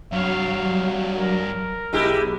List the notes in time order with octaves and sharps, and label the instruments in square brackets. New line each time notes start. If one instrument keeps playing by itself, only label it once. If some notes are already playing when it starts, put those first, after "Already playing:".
[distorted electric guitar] G2 C#5 [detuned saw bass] F#3 [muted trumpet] F5
[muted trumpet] A#4
[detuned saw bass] B1 [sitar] G#3 E4 G4